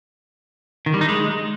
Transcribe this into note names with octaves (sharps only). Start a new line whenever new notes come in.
D#3
G3
D#4
G#3